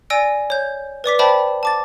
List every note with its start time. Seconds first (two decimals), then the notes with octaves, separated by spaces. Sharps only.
0.10 D5 G#5 E6 A#6 D7
0.50 C#5 G6
1.04 B4 D5 D6 B6
1.19 C5 D5 E5 G5 A5 B5
1.63 A5 D6 A6